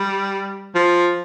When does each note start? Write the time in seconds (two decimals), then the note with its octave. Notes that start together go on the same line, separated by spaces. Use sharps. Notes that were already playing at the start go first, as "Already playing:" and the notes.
Already playing: G3
0.75 F3